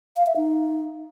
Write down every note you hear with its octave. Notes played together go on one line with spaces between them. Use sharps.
F5
E5
D#4